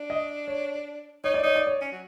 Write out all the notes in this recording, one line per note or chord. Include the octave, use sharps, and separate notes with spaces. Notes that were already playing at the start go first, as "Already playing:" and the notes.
Already playing: D4
D#5
C#5
D#4 C#5
D5
D#4 C#5
D5
C#5
C#4
F#3